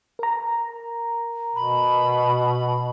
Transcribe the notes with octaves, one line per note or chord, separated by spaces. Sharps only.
A#4 A#5
B2 B5